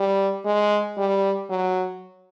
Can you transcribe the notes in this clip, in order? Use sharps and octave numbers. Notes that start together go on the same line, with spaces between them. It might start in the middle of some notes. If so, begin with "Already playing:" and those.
Already playing: G3
G#3
G3
F#3